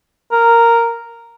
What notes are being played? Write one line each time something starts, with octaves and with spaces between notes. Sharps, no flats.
A#4